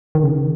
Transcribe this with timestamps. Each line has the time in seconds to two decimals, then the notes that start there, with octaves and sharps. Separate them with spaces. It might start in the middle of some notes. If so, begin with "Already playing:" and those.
0.15 D#3
0.23 C#3